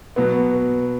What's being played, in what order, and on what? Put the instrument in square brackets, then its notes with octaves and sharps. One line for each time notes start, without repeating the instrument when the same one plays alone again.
[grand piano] B2 F#3 B3